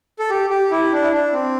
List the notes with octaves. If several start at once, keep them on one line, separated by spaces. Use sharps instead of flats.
A4
G4
G4
E4
D4
E4
D4
C4